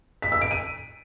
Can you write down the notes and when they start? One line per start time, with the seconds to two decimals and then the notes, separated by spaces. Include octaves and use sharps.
0.22 B6
0.32 E6
0.41 D7
0.51 D#7